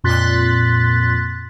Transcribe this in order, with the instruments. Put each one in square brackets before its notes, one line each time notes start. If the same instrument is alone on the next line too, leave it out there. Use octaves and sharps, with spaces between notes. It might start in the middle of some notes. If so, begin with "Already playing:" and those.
[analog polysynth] F2 A#2 C6 F#6 A6 B6